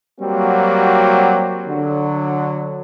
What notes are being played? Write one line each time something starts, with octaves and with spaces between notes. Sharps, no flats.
F#3 G3 A#3 C4 F#4
D3 F#3